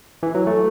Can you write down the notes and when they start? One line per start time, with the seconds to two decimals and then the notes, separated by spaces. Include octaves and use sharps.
0.23 E3
0.35 F#3
0.47 A3